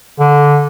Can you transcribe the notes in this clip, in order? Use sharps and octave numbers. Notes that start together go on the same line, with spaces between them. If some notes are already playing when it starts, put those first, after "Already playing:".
D3